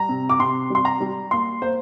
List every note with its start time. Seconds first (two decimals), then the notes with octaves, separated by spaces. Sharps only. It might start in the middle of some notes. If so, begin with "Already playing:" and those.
Already playing: G3 A#5
0.09 C3
0.30 D6
0.39 C3 C6
0.70 G3 C6
0.85 A#5
1.00 G3
1.31 A#3 C6
1.62 A#3 C5